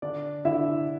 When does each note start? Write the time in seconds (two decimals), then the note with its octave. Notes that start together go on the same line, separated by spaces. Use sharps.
0.02 D3 D4 D5
0.45 D3 E4 E5